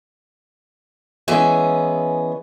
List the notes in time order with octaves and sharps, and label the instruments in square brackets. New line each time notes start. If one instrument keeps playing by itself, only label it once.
[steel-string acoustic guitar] E3 G#3 B3 C#4 G#4 E5